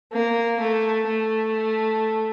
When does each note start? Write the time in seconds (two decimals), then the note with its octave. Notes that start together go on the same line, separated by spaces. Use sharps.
0.12 A#3
0.60 A3
1.07 A3